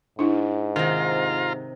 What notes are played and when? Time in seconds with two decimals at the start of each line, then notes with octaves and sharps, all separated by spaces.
0.19 G#2 D4 E4
0.76 C3 D#3 F4 F5 A#5